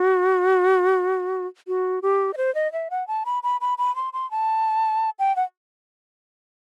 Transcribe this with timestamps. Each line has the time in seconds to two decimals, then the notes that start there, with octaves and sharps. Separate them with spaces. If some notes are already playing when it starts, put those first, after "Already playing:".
Already playing: F#4
1.68 F#4
2.02 G4
2.34 D#5
2.37 C5
2.55 D#5
2.73 E5
2.90 F#5
3.08 A5
3.25 B5
3.43 B5
3.61 B5
3.78 B5
3.96 C6
4.13 C6
4.31 A5
5.19 G5
5.36 F#5